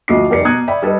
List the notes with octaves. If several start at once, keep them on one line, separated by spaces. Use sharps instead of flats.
D2 F3 F#4 D#5 D6 C7
F1 G4 A#4 D5 C7 C#7
B2 A#5 D#6 F#6 G#6 C#7
D5 E5 G5 B5
G3 A4 B4 D#5